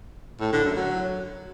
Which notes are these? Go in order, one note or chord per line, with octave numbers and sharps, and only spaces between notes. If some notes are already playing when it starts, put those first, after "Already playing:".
A2
D3
F#2
F#3